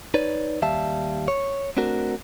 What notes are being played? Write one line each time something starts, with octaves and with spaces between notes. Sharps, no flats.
D#4 B4 C#5 D5
D#2 G3 E5 F5 A5
C#5
A3 C4 D4 F#4 A#4